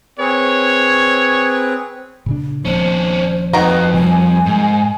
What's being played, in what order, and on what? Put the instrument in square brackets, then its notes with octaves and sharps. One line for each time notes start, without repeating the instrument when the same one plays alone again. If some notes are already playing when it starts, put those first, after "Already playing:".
[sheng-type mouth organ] C4 G#4 B4 [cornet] C#5
[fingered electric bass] A#2 C#3 D4
[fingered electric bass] D#1 F3 A#3 [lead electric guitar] C#4 D4 [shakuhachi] C5
[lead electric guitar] F2 [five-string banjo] D#3 F#4 A#5 [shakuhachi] B4
[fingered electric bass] C3 F3 G3 [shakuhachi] G#5
[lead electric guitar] G#2